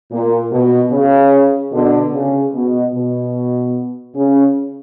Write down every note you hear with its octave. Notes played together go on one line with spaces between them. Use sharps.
A#2
B2
C#3
B2 D3
C#3
B2
B2
C#3